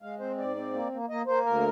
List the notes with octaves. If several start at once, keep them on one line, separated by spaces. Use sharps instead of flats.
G#3 F5
C4 C5
G#2 D5
C4
A#3
A#3
A#3 D#5
A#3 C5
D2 A#4